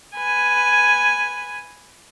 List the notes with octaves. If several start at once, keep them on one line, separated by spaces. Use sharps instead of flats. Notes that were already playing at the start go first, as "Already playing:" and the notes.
B4 G#5